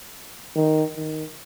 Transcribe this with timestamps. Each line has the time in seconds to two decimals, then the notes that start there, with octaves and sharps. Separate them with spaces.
0.56 D#3
0.96 D#3